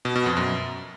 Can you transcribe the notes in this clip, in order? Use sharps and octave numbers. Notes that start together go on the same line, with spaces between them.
B2
B2
F2
F#2